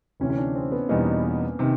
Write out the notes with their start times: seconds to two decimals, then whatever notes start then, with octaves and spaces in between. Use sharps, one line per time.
0.20 D2 C3 E3 C#4
0.30 C#4
0.38 D4
0.55 C4
0.72 B3
0.89 E2 B2 G3 A#3 B3 D#4
1.59 C3 D#3